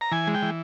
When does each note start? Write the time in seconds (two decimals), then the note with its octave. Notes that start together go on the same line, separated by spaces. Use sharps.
0.01 A#5
0.12 E3 G#5
0.27 G#3
0.34 G5
0.42 E3